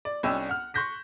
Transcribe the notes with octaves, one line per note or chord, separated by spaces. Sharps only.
D5
C2 C#4 D4 D#5 G5 E6
F#5 F6
C6 C#6 F#6 G6 A#6 B6